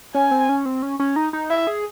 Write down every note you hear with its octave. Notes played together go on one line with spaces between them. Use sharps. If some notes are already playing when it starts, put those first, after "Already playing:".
C#4 G#5
C4
C#4
C4
C#4
C#4
D#4
D#4
E4 E5
G#4